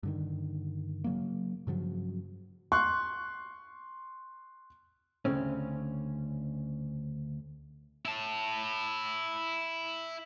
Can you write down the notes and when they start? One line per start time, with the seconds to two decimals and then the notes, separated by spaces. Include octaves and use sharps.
0.03 G2 D3 D#3
1.04 C#3 F#3 A#3
1.67 G2 C#3 F3 F#3
2.72 C6 C#6 F#6
5.25 D2 G2 C#3 C4 C#4
8.05 E4 A5